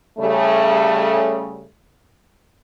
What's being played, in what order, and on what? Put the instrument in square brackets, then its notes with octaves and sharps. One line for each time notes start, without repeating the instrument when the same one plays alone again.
[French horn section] C#3 G3 A3